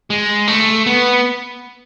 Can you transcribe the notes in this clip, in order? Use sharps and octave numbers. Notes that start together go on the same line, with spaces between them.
G#3
A3
B3